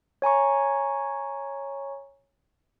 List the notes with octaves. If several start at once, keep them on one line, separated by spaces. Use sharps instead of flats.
C#5 G#5 A#5 C#6